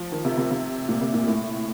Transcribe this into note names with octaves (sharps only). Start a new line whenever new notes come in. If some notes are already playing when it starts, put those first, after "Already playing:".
Already playing: F3
D#3
C3
C3
C3
A#2
C3
A#2
A2